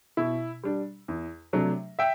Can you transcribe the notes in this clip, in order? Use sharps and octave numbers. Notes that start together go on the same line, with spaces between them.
B2 E4
G3 D4
E2
C3 F#3 A3 D4
E5 G5